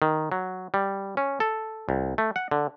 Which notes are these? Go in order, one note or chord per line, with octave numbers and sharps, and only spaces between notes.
D#3
F#3
G3
C#4
A4
C2
A3
F#5
D3